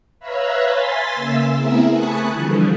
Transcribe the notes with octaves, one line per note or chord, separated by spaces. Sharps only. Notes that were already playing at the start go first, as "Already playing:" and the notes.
B4 C#5 E5 F5 A#5 B5
G#5 C6 A6 B6
C#3 A#3 E5 E6
A3 B3 C4 E4 G#4 A#4
G#5 A5 B5 C#6 D#6 F#6
D3 E3 F3 G3